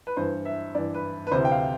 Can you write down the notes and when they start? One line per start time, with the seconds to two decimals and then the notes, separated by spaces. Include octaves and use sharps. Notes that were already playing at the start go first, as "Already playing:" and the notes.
0.07 B4
0.17 G2 E3 C5
0.45 E5
0.75 G2 E3 D5
0.94 B4
1.27 B4
1.32 D2 C3 E3 C5
1.45 G5
1.52 F5